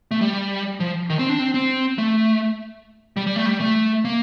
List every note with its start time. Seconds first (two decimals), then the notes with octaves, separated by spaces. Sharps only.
0.11 A3
0.21 G3
0.80 F3
1.10 D#3
1.19 C4
1.29 D4
1.39 C4
1.54 C4
1.98 A3
3.17 G3
3.27 G3
3.36 A3
3.46 G3
3.60 A3
4.05 A#3